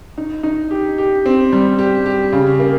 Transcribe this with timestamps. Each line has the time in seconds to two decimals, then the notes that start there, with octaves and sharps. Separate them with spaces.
0.18 D#4
0.43 D#4
0.71 G4
0.98 G4
1.26 C4
1.53 G3
1.79 G4
2.06 G4
2.33 C#3
2.60 A#3